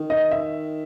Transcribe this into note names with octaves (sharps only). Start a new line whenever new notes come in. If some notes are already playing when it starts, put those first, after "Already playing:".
Already playing: D#3
D#5
E5